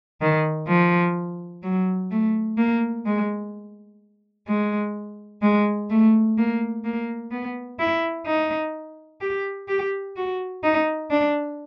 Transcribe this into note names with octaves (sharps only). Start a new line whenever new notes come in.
D#3
F3
F#3
A3
A#3
G#3
G#3
G#3
A3
A#3
A#3
B3
E4
D#4
G4
G4
F#4
D#4
D4